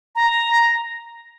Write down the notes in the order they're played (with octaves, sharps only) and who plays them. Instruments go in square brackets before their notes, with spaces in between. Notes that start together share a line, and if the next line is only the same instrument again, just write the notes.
[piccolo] A#5